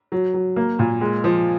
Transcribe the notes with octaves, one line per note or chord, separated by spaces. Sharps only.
F#3
F#3
A#3
A#2
G#3
F3